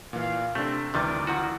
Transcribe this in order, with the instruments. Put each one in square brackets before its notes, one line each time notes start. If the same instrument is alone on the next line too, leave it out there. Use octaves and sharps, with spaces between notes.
[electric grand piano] A#2 E3 [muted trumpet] F5
[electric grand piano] C3 D4 [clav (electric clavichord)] A3 [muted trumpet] C4
[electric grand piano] D2 E3 A6 [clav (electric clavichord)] C3 D#3 G3 [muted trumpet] D5
[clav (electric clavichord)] D#3 F3 F#4 [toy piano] E4 F#5 E6